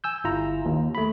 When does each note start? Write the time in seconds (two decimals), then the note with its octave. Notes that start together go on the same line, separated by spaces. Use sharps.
0.04 G#5 E6 G6
0.24 G1 E4 F4 A#5
0.65 D#2
0.95 A3 B5